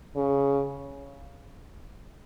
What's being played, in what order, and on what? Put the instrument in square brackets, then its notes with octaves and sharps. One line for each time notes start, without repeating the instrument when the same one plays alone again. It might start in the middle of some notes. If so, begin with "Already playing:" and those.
[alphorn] C#3